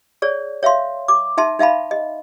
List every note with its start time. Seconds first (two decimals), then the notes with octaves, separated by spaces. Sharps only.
0.22 G#4 C#5 D5
0.63 C#5 E5 F5 C6
1.08 D6
1.37 D#4 E5 A5 C6
1.59 D#4 E5 F5 A5 B5
1.91 D#5